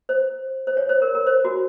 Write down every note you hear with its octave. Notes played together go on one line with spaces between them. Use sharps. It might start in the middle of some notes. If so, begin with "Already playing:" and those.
C5
C5
C#5
C5
A#4
A#4
C5
F#4